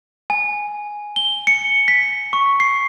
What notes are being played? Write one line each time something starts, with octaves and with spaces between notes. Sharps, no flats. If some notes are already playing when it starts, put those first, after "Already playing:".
G#5
G7
C#7
B6
C#6
C7